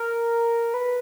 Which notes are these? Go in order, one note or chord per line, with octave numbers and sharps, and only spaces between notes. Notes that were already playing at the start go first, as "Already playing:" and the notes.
Already playing: A#4
B4